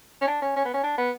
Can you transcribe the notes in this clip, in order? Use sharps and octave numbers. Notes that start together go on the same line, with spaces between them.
C#4
D4
C#4
C#4
B3
C#4
D4
B3